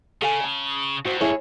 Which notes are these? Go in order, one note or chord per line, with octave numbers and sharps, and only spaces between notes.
C#3 A4 F5 G#5
A5
G2 F#4 C5
E4 G#4 A#4 C#5